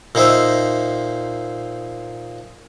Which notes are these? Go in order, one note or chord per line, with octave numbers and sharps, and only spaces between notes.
A#2 D#4 C5 E5